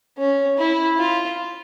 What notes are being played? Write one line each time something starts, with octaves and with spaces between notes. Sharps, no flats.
C#4
E4
F4